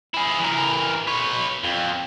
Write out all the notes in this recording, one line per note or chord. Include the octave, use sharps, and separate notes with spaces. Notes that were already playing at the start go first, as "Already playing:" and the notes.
E4 G#4
E3 A#4
B4 C#5
F2